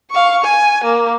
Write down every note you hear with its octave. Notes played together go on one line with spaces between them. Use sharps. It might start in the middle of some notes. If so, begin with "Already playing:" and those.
F5 C#6
G#5
A#3